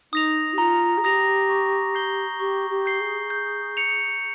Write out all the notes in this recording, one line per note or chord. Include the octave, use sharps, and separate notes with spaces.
D#4 D#6 A#6 F7
G4
F4 A#5
G#4
G4 D#6 A#6 F7
C#6
G6 C7 G7
G4 C#6
G4
G6 C7 G7
G#4
G6
C#7 F7